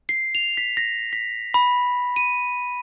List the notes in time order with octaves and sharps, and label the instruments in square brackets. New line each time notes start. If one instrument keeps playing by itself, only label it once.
[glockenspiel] C7
F7
B6
A#6
B6
B5
D#7